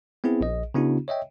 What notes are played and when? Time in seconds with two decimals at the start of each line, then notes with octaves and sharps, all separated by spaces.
0.24 B3 C4 E4 G#4
0.41 A#1 D#5
0.74 C#3 B3 D4 E4 F#4
1.08 C#5 D#5 E5 G5